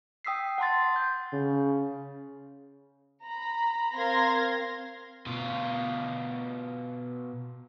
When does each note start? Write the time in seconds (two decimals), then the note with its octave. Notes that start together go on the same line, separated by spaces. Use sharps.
0.25 G5 D#6 E6 B6 C7
0.58 F#5 A5 C6 A6
0.96 G6
1.33 C#3
3.24 A#5 B5
3.96 C4 A#4 F5 C6 G#6 A#6
5.26 B2 F4